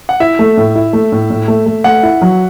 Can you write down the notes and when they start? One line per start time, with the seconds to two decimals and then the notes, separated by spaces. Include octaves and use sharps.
0.09 F#5
0.20 E4 E5
0.39 A3
0.57 A2
0.75 E4
0.93 A3
1.12 A2
1.30 A2
1.48 A3
1.66 A3
1.84 A3 F#5
2.03 E4
2.21 F#3